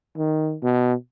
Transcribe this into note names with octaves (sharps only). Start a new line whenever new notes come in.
D#3
B2